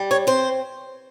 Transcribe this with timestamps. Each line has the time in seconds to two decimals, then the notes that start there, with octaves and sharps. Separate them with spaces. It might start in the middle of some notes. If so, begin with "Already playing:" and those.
Already playing: G3
0.11 C#5
0.27 C4 C5